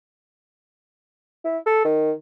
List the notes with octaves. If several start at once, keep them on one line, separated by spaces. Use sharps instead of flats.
E4
A4
D#3